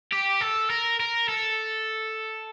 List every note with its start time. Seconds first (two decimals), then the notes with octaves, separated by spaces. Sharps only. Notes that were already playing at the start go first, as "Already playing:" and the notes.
0.13 G4
0.41 A4
0.70 A#4
1.00 A#4
1.29 A4